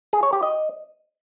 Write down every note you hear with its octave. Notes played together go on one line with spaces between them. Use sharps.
G#4
C#5
G4
D#5